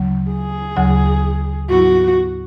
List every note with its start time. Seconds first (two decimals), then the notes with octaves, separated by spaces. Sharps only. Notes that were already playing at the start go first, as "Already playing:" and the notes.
Already playing: D2 C#3 F#3
0.30 G#4
0.76 D2 C#3 F#3
1.69 G#2 F#3 B3 E4 F#4